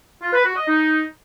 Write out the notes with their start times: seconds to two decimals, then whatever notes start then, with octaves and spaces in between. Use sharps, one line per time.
0.22 F4
0.33 B4
0.45 F#4
0.56 D#5
0.68 D#4